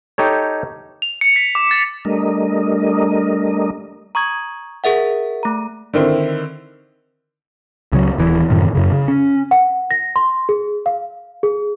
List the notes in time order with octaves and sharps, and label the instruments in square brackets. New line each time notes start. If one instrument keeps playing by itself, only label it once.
[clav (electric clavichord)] D#4 G4 A4 C#5
[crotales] F7
C#7
B6
D6
A6
[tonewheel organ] G3 A3 D4 A#4 D#5
[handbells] A#5 C#6 D#6 G#6
G#4 A#4 E5 F#5
A3 A#5
[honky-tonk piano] D3 D#3 C4 E4
[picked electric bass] C#2 C#3 F#3
D#1 E3
F#2 A2 C3 D#3
F#2 C#3
C#3
C#4
[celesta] F#5
A#6
C6
G#4
F5
G#4